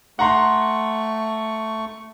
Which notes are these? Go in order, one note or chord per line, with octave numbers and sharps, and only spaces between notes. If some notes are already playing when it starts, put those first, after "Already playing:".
A3 F#5 A#5 C6 C#6